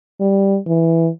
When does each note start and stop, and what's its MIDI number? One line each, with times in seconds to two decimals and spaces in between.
0.20 0.58 55
0.67 1.10 52